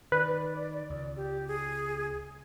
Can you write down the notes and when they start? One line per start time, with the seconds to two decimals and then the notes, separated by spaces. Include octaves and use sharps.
0.12 D#3 B4 D5
0.90 C#2
1.16 G4
1.48 G#4